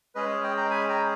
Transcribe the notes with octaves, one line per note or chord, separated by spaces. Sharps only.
G#3 C#4 G#4 B4 D#5
D#5 G5
G5 A#5
G#5 B5
G5 A#5